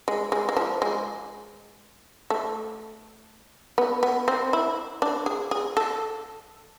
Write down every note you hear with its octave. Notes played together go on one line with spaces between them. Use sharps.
G#3
G#3
G#3
F3
G#3
A3
B3
B3
C4
E4
D4
G#4
G#4
A4